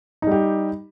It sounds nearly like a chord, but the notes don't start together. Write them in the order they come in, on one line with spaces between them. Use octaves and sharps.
D#4 G3 G4